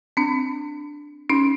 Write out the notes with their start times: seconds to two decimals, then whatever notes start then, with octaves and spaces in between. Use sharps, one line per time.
0.17 C4 D4
1.29 C#4 D#4